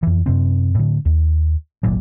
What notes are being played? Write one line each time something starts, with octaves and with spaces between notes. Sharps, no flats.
F2 E3
F#2 C3 C4
A2 D3
D#2
D1 G#1 A#2 F#3